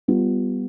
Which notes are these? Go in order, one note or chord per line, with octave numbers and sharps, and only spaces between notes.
G3 B3 F4